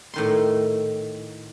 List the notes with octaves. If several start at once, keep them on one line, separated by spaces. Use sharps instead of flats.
A2 D#3 C6